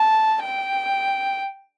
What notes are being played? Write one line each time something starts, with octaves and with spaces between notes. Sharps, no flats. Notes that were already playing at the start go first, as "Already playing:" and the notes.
Already playing: A5
G5